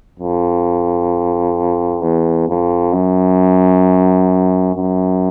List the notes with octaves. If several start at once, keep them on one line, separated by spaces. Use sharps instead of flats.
F2
E2
F2
F#2
F#2